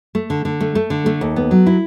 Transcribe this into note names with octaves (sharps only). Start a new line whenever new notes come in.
A3
D3
D3
A3
A3
D3
A3
D#2
B3
F#3
E4